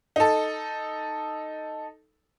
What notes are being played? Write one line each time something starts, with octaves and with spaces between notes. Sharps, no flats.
D#4 A4